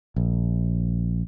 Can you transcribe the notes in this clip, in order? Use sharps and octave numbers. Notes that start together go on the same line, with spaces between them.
A#1